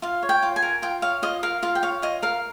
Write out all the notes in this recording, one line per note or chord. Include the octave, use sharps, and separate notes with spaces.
F4 F5
C#5
G5
F4
G#5
A#4
F4 G5
C#5 F5
F4 D#5
A#4 F5
F4 F5
G5
C#5 F5
F4 D#5
A#4 F5